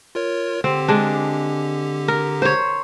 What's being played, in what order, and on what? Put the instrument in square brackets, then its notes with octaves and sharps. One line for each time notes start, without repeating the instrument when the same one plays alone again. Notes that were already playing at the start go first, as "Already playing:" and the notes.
[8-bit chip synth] F4 A#4 C#5
[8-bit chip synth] D3 G4 [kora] C4
[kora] G#3 D4
A#4
C5 C#5